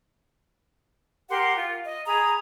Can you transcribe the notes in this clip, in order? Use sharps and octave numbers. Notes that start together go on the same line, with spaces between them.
G4 A#4 F#5 C6
F4
D#5
G#4 A#5 B5 D#6